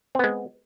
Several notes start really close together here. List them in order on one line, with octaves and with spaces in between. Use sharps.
C4 B3 G#3